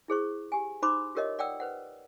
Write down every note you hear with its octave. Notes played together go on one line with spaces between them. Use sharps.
E4 G#4 C5 C#6
G4 G#5
D#4 C5 B5 C6 D6
F4 G4 A#4 C#5 D#5 E5
D5 F#5 G5 D#6 E6
B4 C5 F#5